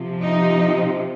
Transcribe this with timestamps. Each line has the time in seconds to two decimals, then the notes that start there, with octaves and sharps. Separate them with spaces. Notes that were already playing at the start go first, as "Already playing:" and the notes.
Already playing: C3 F3
0.22 D#4